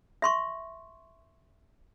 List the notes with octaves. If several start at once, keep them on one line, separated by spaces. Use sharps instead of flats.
E5 C6 C#6